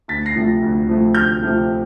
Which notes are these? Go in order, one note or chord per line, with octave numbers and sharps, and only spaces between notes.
D2 A6 B6
A#6 C7
C3 F3 A3
D2
C3 F3 A3
D2 F6 G6
C3 F3 A3